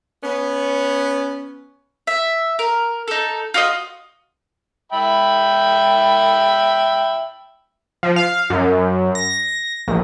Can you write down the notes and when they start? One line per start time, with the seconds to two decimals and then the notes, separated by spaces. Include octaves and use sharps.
0.22 B3 C#4
2.07 E5
2.59 A#4
3.08 D#4 A4
3.54 F4 F#4 D5 D#5
4.92 E5 G5 B5
8.03 F3
8.16 F5
8.50 F#2
9.15 A#6
9.88 A#1